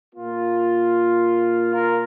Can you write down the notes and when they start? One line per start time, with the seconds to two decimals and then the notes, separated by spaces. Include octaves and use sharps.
0.15 A#2 A#3 F4
1.74 F4 A#4